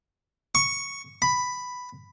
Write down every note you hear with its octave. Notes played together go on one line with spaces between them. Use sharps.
C#6
B5